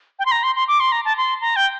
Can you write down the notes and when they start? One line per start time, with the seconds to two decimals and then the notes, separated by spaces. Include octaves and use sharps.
0.19 G5
0.26 C6
0.32 A#5
0.43 C6
0.56 C6
0.68 D6
0.80 C6
0.92 A#5
1.05 A5
1.17 C6
1.41 A#5
1.56 G5